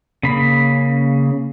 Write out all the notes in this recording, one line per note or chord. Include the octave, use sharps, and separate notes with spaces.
C#3 A#3 B5